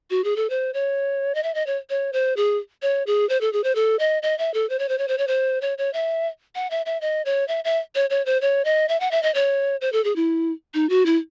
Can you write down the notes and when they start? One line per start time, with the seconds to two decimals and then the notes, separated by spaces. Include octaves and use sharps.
0.10 F#4
0.24 G#4
0.36 A4
0.50 C5
0.74 C#5
1.35 D#5
1.43 E5
1.55 D#5
1.67 C#5
1.90 C#5
2.13 C5
2.37 G#4
2.82 C#5
3.07 G#4
3.29 C5
3.41 A4
3.53 G#4
3.64 C5
3.75 A4
3.99 D#5
4.23 D#5
4.39 E5
4.54 A4
4.70 C5
4.79 C#5
4.89 C5
4.98 C#5
5.08 C5
5.18 C#5
5.27 C5
5.62 C#5
5.78 C#5
5.93 E5
6.55 F#5
6.71 E5
6.86 E5
7.01 D#5
7.25 C#5
7.48 E5
7.64 E5
7.95 C#5
8.10 C#5
8.26 C5
8.41 C#5
8.65 D#5
8.89 E5
9.00 F#5
9.11 E5
9.23 D#5
9.34 C#5
9.81 C5
9.92 A4
10.04 G#4
10.16 E4
10.74 D#4
10.89 F#4
11.06 E4